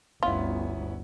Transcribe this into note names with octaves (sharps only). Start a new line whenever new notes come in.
G1 D2 B3 C#4 E4 F4